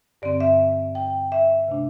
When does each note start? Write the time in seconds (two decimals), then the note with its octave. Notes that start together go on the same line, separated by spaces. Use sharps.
0.22 G2 D3 C4 D5
0.40 E5
0.95 G5
1.32 E5
1.68 C3 A3 D4